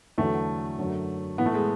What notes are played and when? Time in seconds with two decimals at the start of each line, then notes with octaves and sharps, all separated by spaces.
0.18 E2 D3 F#3 A3
0.78 F#2 D3 F#3
1.38 A2 E3 B3
1.46 A3
1.54 G#3